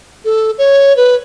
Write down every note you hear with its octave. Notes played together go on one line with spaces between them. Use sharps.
A4
C#5
B4